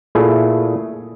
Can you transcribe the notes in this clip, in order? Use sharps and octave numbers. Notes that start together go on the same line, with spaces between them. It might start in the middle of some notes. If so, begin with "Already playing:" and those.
A#2 A3 E4 G#4